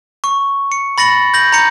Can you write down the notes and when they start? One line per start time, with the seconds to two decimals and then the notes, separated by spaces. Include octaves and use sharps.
0.24 C#6
0.72 C#7
0.98 B5 A6 A#6 C#7 F#7
1.34 G6 A#6 F#7
1.53 A#5 G6 C#7